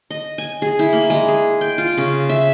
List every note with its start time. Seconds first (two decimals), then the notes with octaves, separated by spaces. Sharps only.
0.10 D#5
0.38 G#5
0.62 G#4
0.79 E4
0.93 A#3
1.10 G#3
1.28 G#4
1.61 G5
1.78 F4
1.98 C#3
2.29 E5